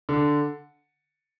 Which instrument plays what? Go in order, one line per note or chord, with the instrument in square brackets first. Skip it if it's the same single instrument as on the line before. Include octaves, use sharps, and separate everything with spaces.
[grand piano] D3